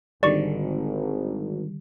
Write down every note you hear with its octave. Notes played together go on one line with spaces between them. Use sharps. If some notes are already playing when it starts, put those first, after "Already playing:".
G#1 D3 D#3 G3 D5 C#6